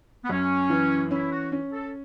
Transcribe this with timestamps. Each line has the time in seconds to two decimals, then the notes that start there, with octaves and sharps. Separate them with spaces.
0.24 B3
0.29 F#2 C#4
0.70 E3
1.11 C#4 E4
1.32 F#4
1.52 C#4
1.73 A4